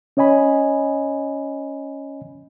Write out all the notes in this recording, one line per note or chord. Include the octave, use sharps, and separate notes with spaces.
C#4 C#5 D#5 G#5 B5